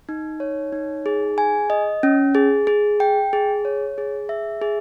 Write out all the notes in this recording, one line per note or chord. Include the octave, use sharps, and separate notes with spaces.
D#4
C#5
D#4
G#4
G#5
D#5
C#4
G#4
G#4
G5
G#4
C#5
G#4
E5
G#4